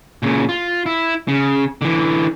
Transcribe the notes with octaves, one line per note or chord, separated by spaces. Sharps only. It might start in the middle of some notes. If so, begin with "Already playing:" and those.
A#2 C#3
F4
E4
C#3
D3 E3